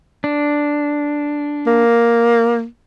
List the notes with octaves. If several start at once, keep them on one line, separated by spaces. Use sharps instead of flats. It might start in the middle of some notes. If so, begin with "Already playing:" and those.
D4
A#3